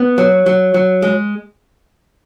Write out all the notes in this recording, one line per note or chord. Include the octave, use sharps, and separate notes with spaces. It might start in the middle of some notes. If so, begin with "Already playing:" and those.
Already playing: B3
F#3
F#3
F#3
G#3